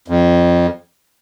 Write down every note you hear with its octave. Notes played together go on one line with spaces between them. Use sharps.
F2